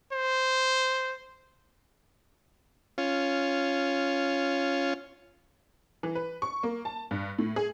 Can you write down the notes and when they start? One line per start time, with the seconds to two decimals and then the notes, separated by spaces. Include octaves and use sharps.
0.12 C5
2.98 C#4 F4
6.03 E3
6.15 B4
6.42 C#6
6.63 A#3
6.85 A5
7.11 G2
7.39 A2
7.56 G#4